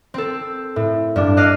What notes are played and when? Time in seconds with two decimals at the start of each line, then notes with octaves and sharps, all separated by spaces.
0.14 C4 A4
0.76 A2
1.16 G2 D4
1.37 D5 D#5 F5 D#6 F#6